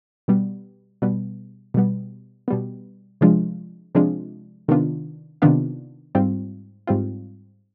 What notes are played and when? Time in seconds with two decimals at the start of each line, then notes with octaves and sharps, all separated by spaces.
0.28 B2 G3 B3
1.02 B2 G3 B3
1.74 B2 G3 B3
2.48 B2 G3 B3
3.21 C3 F3 G#3 D4 F4
3.95 C3 F3 G#3 D4 F4
4.68 C3 D#3 B3 D4 F4
5.42 C3 D#3 B3 D4 F4
6.15 G#2 G3 C4 F4
6.87 G#2 G3 C4 F4